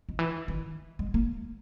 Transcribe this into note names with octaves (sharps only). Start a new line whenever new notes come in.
D#3
E3
D#3
G#3
A#3